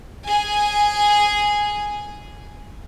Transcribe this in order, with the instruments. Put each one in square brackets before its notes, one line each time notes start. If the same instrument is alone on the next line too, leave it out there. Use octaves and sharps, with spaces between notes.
[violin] G#4 G#5